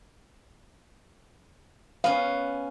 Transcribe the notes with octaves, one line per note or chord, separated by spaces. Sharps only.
B3 C#4 F5